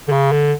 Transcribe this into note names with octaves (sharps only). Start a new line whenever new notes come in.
D3
C#3
D3